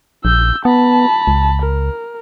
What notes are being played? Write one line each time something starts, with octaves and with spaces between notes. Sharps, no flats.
A#1 E6 G6
B3 A5 B5
C#2
A#4